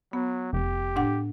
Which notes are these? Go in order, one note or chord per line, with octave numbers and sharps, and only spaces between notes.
F#3 B3
F1 G4
A2 D4 F#5